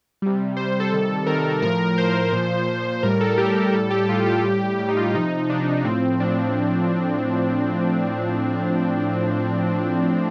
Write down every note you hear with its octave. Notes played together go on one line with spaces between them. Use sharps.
C3 G3
C3 G3 C5
A4
C3 D#3 G3 A4
C3 D#3 G3 A#4
A2 F3 A#4
A2 F3 C5
A#2 F3
A#2 F3
A2 G3 A#4
A4
A2 G3 G4
A2 G3 A4
G4
A2 G3 F4
G4
A2 G3
A2 G3 G4
D#4
F4
C3 F3 D#4
C3 F3 D4
A2 F3 C4
A2 F3 D4